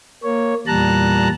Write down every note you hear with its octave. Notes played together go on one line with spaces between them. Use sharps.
A#3 C#5
E2 A#2 G3 A5 A#5 F#6